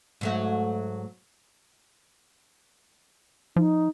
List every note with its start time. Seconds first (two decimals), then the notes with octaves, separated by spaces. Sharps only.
0.21 G#2 F#3 A3
3.56 F3 D#4